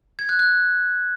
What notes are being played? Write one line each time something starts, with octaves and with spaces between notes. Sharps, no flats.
G#6
F#6
F#6